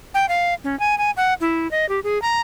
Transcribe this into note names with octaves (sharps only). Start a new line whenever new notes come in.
G5
F5
C#4
G#5
G#5
F#5
E4
D#5
G4
G#4
A#5